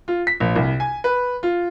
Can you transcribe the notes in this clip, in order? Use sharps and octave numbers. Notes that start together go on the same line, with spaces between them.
F4
B6
A#1
C2
G#5
B4
F4